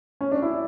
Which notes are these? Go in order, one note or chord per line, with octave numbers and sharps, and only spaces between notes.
C#4
D4
E4